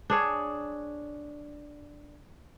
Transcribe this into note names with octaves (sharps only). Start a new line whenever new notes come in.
D4 G#4 C#5